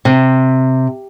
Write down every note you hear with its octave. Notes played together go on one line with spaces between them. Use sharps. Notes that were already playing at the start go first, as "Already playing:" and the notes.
C3